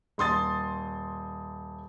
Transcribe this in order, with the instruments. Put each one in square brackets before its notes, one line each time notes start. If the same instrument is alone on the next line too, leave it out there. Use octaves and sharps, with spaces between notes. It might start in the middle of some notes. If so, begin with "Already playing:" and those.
[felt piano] D#1 C6 D#6 A6